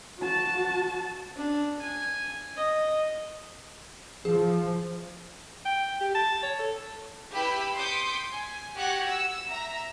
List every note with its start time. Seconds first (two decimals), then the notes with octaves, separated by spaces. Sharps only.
0.19 F#4 A5
1.36 D4
1.82 G#5
2.57 D#5
4.25 F3 G#4
5.65 G5
6.00 G4
6.15 A5
6.42 C#5
6.59 A4
7.34 E4 G4 B4 G5 B5 E6
7.77 C6 D6 D#6 G6 B6 C#7
8.31 G#5
8.77 F#4 G4 F#5 F#6 G#6
9.06 E6
9.49 E5 A#5